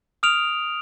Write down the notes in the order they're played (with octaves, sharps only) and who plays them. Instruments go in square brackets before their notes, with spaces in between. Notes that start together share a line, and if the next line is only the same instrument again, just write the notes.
[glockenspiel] D#6 F6 D7 F7